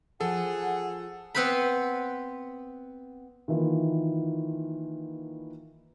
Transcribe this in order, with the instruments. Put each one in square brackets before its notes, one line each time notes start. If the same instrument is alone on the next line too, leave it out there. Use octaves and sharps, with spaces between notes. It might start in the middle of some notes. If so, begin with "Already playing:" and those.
[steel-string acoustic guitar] F3 [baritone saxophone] G#4 [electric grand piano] A4 [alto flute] F#5
[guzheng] B3 C4 B4 C5 B5
[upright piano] D#3 E3 A#3 E4 F4